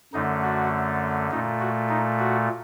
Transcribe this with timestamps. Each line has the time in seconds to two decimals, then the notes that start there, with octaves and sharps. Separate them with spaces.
0.13 F#2 D3 A3 D#4
0.43 F#4
1.31 A#2 A3 D#4
1.60 F#4
1.90 D#4
2.19 F#4